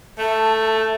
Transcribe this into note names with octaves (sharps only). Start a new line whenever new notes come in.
A3 A5